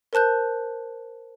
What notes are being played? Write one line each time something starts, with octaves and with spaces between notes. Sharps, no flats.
A#4 C5 A5 F#6 G6